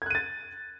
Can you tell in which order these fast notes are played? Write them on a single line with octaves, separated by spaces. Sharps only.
G#6 F#6 D#7 A6